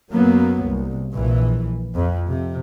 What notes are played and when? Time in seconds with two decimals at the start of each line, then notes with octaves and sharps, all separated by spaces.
0.11 F#2 F#3 A#3 B3
0.63 C2
1.15 A#1 E3
1.95 F2
2.29 C3